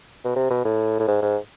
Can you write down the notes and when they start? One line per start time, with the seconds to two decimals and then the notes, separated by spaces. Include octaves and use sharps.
0.24 B2
0.36 C3
0.50 B2
0.65 A2
0.99 A2
1.07 G#2
1.22 G#2